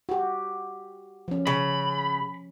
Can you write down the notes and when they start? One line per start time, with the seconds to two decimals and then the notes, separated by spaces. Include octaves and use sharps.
0.09 F#4 G4
1.28 F3 C#4
1.47 C#3 B5